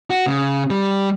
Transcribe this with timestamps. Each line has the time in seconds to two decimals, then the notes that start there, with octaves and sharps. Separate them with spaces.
0.10 F#4
0.26 C#3
0.70 G3